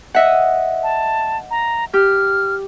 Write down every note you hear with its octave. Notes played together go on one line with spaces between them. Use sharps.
D#5 E5 F#5
A5
A#5
G4 F6